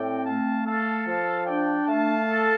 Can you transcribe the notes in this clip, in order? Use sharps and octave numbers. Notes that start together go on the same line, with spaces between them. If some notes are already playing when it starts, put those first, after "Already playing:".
Already playing: A2 C4 D5 G5
A3 F5 A5
A4 F5 A5
F3 F5 A5
D4 D5 G5
A3 F5 A5
A4